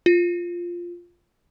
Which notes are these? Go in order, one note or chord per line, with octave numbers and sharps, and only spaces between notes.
F4